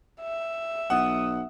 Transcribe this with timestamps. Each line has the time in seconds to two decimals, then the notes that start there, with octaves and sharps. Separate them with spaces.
0.21 E5
0.90 B1 F#5 D#6